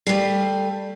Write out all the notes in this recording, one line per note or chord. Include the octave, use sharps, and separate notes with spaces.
G3 A3